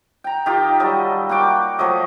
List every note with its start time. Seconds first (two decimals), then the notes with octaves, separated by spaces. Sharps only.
0.24 G5 A#5
0.46 D#3 D#4 F4 G4
0.80 F#3 G3 A4 D#5
1.29 A#3 F#4 G5 D6
1.79 F3 F#3 A3 D#5